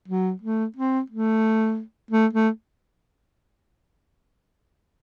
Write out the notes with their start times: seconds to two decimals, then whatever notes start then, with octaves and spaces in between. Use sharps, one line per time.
0.08 F#3
0.42 A3
0.76 C4
1.10 A3
2.11 A3
2.33 A3